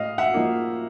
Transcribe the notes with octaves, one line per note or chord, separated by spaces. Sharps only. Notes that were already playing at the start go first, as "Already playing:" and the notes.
Already playing: A2 D#5 F5
E5 F#5
F3 A#3 D#4